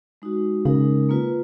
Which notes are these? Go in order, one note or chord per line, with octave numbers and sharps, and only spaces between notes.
G#3 D#4 F#4
C#3 G#3 D#4 A#4
A#3 F4 B4